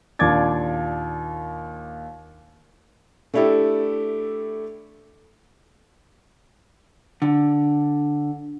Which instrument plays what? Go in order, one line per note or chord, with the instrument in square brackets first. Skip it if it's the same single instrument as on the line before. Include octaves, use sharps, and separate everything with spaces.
[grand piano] D#2 A#2 D4 D6 G#6 A6
[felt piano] A3 D4 E4 G4 A4
[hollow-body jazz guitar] D3